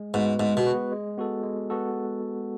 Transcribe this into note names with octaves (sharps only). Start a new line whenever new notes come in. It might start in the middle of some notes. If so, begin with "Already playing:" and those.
Already playing: G#3
G#2 B3 F#4 B4
G#2 G#3
B2
B3 F#4 B4
G#3
B3 F#4 A4
G#3
B3 F#4 A4